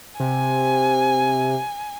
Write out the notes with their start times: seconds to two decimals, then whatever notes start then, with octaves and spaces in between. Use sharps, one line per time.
0.20 C3 G#5